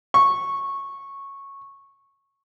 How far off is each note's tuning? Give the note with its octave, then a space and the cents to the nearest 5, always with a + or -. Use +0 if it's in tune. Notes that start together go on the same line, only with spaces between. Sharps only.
C#6 -10